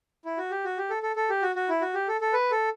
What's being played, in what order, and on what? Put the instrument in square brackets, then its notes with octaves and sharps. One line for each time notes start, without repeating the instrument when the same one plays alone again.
[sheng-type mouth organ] E4
F#4
G4
F#4
G4
A4
A4
A4
G4
F#4
F#4
E4
F#4
G4
A4
A4
B4
A4